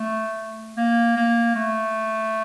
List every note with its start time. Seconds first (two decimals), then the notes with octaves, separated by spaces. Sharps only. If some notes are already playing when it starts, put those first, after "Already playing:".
Already playing: A3
0.77 A#3
1.17 A#3
1.55 A3